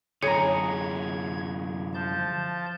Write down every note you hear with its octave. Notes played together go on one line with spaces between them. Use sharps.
F#2 D3 G#4 C#5 A#5 G#6
F3 A5 G6